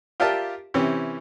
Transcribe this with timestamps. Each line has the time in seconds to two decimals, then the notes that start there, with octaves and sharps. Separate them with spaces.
0.20 F4 G4 A#4 D5 E5 A5
0.74 C3 E3 C#4 G4